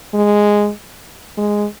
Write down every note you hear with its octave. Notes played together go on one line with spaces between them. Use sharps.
G#3
G#3